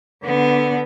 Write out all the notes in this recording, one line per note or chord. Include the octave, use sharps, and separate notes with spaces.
D3 B3